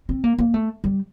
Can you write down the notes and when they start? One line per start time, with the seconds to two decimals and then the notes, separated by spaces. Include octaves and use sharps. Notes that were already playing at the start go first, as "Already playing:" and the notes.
0.09 C4
0.24 A#3
0.38 A#3
0.54 A3
0.84 G3